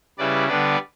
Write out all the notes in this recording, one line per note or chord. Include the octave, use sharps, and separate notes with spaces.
C#3 G3 C#4 E4 B4 D5
D3 G3 B3 D4 B4 D5